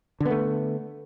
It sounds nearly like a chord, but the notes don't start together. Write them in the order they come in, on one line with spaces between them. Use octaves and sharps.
D3 B3 A3